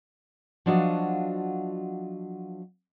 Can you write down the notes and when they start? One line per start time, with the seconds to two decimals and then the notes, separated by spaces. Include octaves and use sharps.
0.66 F3 F#3 D4 F4 F#4 D#5